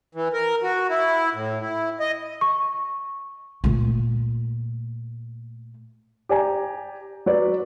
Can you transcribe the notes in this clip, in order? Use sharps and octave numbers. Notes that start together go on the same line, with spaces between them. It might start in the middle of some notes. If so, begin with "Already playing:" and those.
E3
A#4
F#4
E4
A2
E4
D#5
C#6
A#2 A3
G4 D5 G#5 A#5
F#3 B4 D5